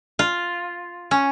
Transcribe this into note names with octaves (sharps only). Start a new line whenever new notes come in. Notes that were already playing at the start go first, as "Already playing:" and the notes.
F4
C#4